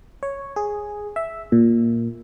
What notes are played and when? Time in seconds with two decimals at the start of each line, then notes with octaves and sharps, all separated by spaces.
0.23 C#5
0.56 G#4
1.16 E5
1.52 A#2